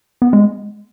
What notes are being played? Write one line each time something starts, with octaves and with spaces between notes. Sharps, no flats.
B3
G#3